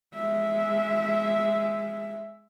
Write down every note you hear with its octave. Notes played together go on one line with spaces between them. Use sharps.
G#3 E5